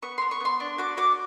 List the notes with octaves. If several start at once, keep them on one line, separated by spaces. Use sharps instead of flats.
B3 C#6
B3 C6
C#6
B3 C6
D4
F#4 D6
F#4 D6